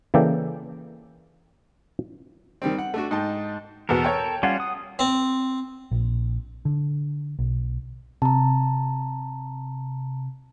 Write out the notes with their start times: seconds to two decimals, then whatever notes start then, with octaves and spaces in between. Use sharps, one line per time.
0.14 C#3 E3 A#3 A4 D5 G5
2.62 D#3 G3 C4
2.78 F#5
2.94 A3 D4 F#4
3.11 G#2 D#4 D#5 G5 A5
3.89 E2 B2 B3 A4 A#4
4.04 C#5 G5
4.43 G3 C#4 F4 F#5
4.60 D#6
4.99 C4
5.91 A#1
6.65 D3
7.39 B1
8.22 C3 A5 A#5